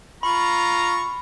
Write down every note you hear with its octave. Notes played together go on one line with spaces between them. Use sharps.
F4 A#5 B5 C#6